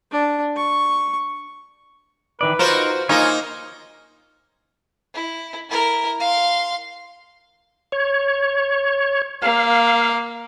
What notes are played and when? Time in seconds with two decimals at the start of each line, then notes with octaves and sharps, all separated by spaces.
0.12 D4
0.57 C#6
2.41 D#3 E3 B4 D5
2.59 D#4 F4 F#4 A#4 C5
3.09 A#3 D#4 F4 C#5 F5 G#5
5.14 E4
5.69 E4 A#4
6.20 F5 C6
7.92 C#5
9.42 A#3 F5